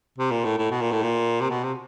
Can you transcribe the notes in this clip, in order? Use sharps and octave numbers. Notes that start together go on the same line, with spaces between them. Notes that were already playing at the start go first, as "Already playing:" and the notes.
C3
A#2
A2
A2
B2
A#2
A2
A#2
C3
B2
C3